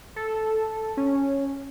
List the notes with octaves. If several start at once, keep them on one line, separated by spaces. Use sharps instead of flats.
A4
C#4